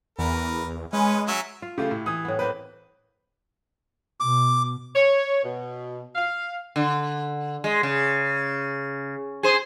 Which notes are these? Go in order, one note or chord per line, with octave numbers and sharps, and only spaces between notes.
E2 A#4 B4
G#3 C#4 B4
F#3 C#4 E5
F4
C#3 A3 E4 F4 G4
A2
E3 D#6
A2 B3
A#3 C4 B4 G5
B2 D6
C#5
B2
F5
D3
G#3
C#3
G#4 C5